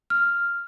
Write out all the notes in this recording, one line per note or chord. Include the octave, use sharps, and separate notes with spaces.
F6